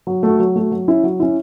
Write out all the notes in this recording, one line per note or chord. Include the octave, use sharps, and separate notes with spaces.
F#3
A3 F#4
F#3
A3 F#4
F#3
C#4 E4
F#3
C#4 E4